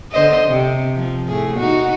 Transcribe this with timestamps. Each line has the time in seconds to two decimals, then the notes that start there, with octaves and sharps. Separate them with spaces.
0.12 D3 C5 D#5
0.47 C3
0.95 F3
1.28 A2 G#4
1.56 D#4 F#4